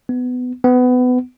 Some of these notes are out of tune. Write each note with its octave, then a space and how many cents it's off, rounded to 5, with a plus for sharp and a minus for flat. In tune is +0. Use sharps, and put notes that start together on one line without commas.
B3 +20
B3 +25